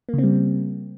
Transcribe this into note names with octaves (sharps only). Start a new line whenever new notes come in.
C#3 G3 A#3 C4